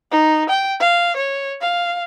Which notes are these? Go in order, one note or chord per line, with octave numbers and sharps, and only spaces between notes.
D#4
G5
F5
C#5
F5